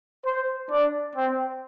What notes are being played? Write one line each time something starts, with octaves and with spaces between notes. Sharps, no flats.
C5
D4
C4